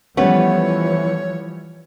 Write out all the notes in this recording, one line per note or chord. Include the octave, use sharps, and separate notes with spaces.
E3 F3 G3 A3 B3 C#4 B4 C#5